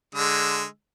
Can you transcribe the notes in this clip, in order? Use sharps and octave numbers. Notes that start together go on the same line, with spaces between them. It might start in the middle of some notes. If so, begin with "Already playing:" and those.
D3 G#3 E6